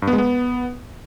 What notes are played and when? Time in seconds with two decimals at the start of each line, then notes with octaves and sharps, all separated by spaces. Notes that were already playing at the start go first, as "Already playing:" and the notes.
0.02 G2
0.08 B3
0.13 G#3
0.18 B3